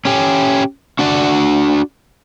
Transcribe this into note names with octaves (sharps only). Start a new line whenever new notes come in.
C#4 G4
D4 F#4 D5